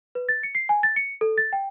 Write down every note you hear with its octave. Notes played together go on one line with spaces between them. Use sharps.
B4
A6
C#7
C7
G#5
A6
C#7
A4
A6
G5